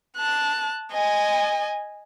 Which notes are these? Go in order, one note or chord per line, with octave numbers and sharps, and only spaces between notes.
A5 F#6
D#5 G#5